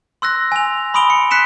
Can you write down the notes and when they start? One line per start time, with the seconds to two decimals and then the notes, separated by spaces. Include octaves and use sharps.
0.22 C6 E6 F#6 A#6
0.52 G#5 F7
0.94 B5 C6 D#6 D7 F7 G7
1.10 C#7
1.31 F#6 B6 C#7 E7